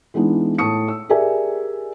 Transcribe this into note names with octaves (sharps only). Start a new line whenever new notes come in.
E3 G#3 B3 D4 D#4
A2 A5 C#6 D#6 C#7
E6
G4 G#4 A#4 D5 E5 G#5